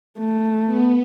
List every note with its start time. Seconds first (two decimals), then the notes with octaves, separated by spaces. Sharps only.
0.18 A3
0.66 B3